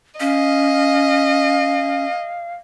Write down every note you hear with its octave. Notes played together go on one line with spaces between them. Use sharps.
C#4 D#5 F5